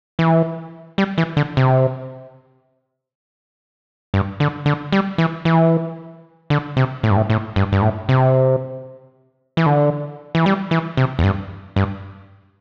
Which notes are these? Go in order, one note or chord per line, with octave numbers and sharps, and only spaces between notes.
E3
G3
E3
D3
C3
G2
D3
D3
G3
E3
E3
D3
C3
A2
G2
A2
A2
G2
G2
A2
C3
E3
D3
E3
G3
E3
C3
E2
G2
G2